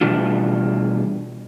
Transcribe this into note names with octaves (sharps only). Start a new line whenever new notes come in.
B2 E3 G3 D4 F4